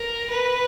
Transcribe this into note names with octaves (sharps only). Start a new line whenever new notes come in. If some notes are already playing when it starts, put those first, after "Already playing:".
Already playing: A#4
B4